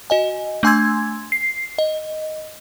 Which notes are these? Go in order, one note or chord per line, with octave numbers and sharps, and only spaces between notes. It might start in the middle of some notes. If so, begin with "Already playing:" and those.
F#4 D#5 G#5
A3 D4 G#5 C6 E6 G#6
C7
D#5